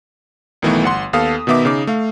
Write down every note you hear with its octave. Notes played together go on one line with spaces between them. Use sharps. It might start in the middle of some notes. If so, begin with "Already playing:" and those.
B1 D#3 E3 A3 B3
G1 F#5 C6
D#2 B3 A4 F5 D#6
B2 D#3 B3 E5 D6
C#3 D#4 D6
A3 F5